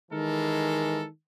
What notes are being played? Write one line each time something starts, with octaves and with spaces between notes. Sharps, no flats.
D#3 E3 G#3 A4 A#4